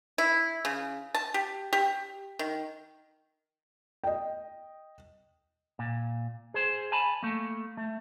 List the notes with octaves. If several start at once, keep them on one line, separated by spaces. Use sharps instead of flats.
E4
C#3
A5
G4
G4
D#3
D#5 G5
A#2
G#4 C5
G#5 A5 B5
A3 A#3
A3